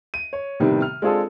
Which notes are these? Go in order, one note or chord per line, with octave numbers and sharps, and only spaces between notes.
D#7
C#5
A2 C3 D#3 G3 B3
F6
G#3 C4 D4 F4 G#4 A4